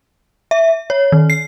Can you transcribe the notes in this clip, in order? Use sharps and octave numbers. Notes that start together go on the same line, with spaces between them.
E5
C#5
D#3
C7